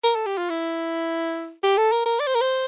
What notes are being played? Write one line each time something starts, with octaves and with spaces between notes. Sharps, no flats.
A#4
A4
G4
F4
E4
G4
A4
A#4
A#4
D5
C5
A#4
C5